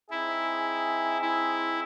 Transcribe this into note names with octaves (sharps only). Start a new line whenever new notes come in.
C4 D#4 E4 G#4
E4